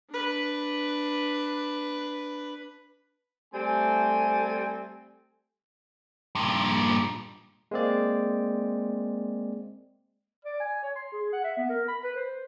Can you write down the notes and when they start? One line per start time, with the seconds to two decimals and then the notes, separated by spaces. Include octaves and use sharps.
0.10 D4 B4
3.54 G3 A3 C4 G#5
6.35 G2 A#2
7.71 G#3 A#3 C4 D5
10.45 D5
10.60 G#5
10.83 C#5
10.96 C6
11.12 G#4
11.33 F#5
11.44 E5
11.58 B3
11.69 A#4
11.88 B5
12.04 B4
12.16 C5